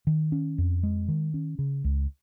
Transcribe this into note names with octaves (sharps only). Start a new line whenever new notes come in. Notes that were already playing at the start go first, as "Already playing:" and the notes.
D#3
C#4
F2
G#3
D#3
C#4
C#3
C#2